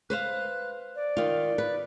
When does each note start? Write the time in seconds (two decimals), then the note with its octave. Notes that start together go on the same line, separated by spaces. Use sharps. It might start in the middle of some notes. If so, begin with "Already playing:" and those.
0.10 B4 C5 F5 F#6
0.96 D5
1.17 D#3 F4
1.58 B4